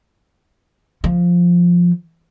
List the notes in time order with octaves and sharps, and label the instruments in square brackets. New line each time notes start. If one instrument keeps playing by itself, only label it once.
[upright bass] F3